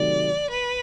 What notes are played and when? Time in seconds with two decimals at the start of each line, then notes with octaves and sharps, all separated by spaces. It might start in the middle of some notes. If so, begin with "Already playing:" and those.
Already playing: C3 D#3 F#3 A3 D5
0.50 B4